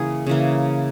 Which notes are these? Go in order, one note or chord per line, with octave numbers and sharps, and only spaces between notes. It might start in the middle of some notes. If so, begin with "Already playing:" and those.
Already playing: C#3 E3 A#3 G#4
C#3 E3 A#3